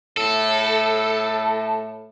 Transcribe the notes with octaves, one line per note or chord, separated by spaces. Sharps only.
A2 A4